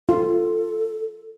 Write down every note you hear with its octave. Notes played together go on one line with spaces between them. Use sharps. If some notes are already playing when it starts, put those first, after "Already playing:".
F4 A4